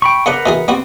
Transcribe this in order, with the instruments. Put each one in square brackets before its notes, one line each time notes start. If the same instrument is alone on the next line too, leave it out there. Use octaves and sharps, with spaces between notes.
[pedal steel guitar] G5 B5 C#6
[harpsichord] C#3 B3 D4 [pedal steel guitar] A#4 B4 F#5
[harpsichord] B2 E3 G#4
[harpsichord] G3 B3 F#4 [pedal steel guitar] C4